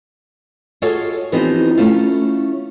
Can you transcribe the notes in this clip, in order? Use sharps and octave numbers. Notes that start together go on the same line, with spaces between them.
F4 F#4 G#4 A4 C#5 D#5
E3 F3 B3 C4 D#4 G4
A3 C#4 E4 F4